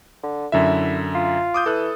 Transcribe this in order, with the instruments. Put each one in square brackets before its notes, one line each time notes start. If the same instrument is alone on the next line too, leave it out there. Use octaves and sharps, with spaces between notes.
[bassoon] D3
[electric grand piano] F#2 D3 E5 [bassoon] E4
[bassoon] F4
[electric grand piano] D6 D#6 G6
[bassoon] E3 [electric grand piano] A4 F#6